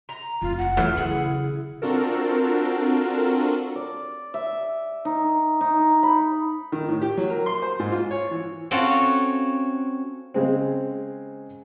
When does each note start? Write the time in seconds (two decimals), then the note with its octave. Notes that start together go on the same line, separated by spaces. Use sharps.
0.09 A#5
0.42 F1 F4
0.58 F#5
0.77 E2 E3 F#3 A3 F4
0.97 C#3 E4 G#4 F#5
1.82 C4 D4 F4 F#4 A4 A#4
3.76 D5
4.34 E5
5.05 D#4
5.61 D#4
6.03 B5
6.72 D#3
6.88 A2
7.02 G4
7.17 F#3
7.30 A#4
7.46 C6
7.62 C5
7.79 G#2
7.92 F4
8.11 C#5
8.31 E3
8.71 C4 C#4 F4 F#4 A4 C#5
10.34 C#3 G#3 C4